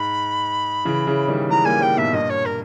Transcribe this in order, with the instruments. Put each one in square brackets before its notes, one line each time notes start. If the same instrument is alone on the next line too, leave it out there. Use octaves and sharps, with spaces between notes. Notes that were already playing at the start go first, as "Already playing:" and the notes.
Already playing: [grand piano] G#2 [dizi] B5
[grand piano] C#3 E3
C#3 E3
D#3 G3
[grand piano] E3 G#3 [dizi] A#5
[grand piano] G3 A#3 [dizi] G#5
[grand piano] G3 A#3 [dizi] G5
[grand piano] G#2 B2 [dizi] E5
[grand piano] G2 A#2 [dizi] D#5
[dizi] C#5
A#4